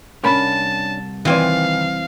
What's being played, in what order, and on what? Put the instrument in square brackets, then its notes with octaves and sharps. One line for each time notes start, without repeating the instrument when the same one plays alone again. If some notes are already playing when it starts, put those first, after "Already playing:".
[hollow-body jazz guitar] C2 A#4 B5 [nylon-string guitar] C#4 D4 [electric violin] A5
[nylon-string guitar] D#3 B4 D5 [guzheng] E3 C4 G#5 [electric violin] F5